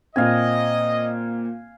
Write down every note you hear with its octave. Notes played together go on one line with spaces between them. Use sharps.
A#2 C4 D#5 F5 G#5